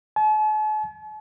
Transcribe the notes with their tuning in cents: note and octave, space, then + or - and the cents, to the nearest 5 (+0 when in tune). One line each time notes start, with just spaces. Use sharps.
A5 -45